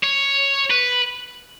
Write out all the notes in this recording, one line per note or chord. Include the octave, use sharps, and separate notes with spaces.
C#5
B4